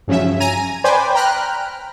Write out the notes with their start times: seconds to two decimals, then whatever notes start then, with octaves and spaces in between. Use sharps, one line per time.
0.08 G2 C#3 F3 F#3 C#4 E5
0.40 G#5 A#5 D#7
0.84 B4 C5 D5 G5 G#5 B5
1.14 G5 A#5 B5 F6 F#6